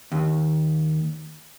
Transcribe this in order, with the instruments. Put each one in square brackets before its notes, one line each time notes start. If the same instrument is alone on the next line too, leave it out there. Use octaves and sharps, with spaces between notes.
[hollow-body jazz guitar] D#2